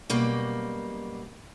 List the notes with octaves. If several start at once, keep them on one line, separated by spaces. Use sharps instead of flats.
F#2 B2 G3 A#3